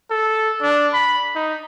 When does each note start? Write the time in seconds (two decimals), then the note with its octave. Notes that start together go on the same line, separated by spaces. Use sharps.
0.11 A4
0.62 D4
0.93 B5
1.35 D#4